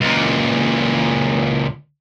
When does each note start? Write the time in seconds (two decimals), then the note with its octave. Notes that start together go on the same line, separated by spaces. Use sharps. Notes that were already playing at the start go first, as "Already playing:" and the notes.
0.01 C#2 A#2